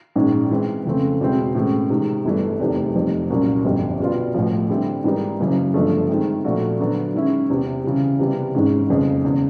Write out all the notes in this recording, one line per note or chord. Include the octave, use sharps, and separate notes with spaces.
A#1 G#2 D#3 G#3 C#4
E3 G#3 C4
F2 C#3 E3 A3 C4
E2 B2 G#3 C4 E4
A2 E3 G#3 C#4
C3 D#3 G#3
G1 G2 E3 A3
F1 E2 C3 D#3 G3
F1 F2 C3 D#3 G3
C2 A#2 F#3 A#3 C#4
G1 F2 D3 G3 C4
B2 G3 B3 D4 F4
A1 A2 F3
D3 G3 C4 E4
G#2 E3 G3 A#3 D#4
F#1 F#2 C#3 E3
G1 G2 D3 F3 A3
D#3 G#3 C4
A#2 F3 A3 D4 F#4
D3 F#3 B3
D#3 G#3 C#4 E4
E2 C3 E3
C#3 E3 G3
C3 E3 G3 B3
G#1 G#2 E3 G#3 C#4
F#1 F2 C#3 F3 G#3
E2 C#3